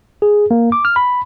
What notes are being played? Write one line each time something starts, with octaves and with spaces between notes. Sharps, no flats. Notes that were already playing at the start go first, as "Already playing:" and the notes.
G#4
A#3
D6
F6
B5